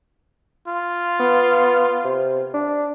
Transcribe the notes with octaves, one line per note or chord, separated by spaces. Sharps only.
F4
B3
C3
D4